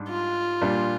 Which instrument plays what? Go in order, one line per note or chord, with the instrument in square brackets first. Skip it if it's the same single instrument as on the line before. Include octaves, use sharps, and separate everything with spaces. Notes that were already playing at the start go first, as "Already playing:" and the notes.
Already playing: [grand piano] G#2 G3 D4
[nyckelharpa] F4
[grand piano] A#2 G3 D4